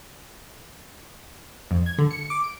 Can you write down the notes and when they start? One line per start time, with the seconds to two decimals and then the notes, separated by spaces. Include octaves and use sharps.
1.71 F2
1.86 G#6
1.99 D3
2.11 C#7
2.30 D6
2.44 D7